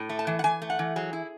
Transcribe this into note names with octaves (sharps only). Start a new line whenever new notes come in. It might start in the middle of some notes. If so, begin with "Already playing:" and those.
Already playing: A2
A3
A5
E3
F#5
E3 G#5
A3
F#5
E3
F#3 G#4
E4